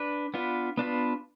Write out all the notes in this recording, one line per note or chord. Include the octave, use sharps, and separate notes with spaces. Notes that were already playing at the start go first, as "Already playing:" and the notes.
Already playing: D4 B4
B3 D4 F4 B4
B3 D4 F4 B4